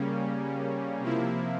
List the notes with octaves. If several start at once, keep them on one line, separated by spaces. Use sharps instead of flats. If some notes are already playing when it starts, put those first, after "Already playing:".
Already playing: C#3 G3 A#3 C#4
C3 F3 A#3 E4